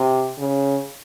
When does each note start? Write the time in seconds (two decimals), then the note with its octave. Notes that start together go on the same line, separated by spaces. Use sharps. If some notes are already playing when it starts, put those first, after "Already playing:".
Already playing: C3
0.39 C#3